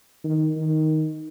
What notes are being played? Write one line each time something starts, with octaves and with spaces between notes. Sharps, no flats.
D#3
D#3